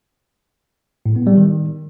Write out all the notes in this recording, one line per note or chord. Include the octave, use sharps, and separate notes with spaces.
A2
B3
G3
D#3